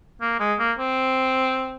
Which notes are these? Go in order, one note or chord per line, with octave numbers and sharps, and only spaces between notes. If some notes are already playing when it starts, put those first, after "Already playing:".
A#3
G#3
A#3
C4